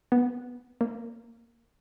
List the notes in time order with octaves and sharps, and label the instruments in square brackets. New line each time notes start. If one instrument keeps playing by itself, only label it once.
[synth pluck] B3
A#3